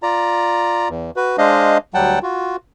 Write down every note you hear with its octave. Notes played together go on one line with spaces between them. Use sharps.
F4 D5 A#5
E2
F#4 B4
G#3 D4 C5 D#5 F5
D2 F#3 G3 F#5 G5 A5
F4 F#4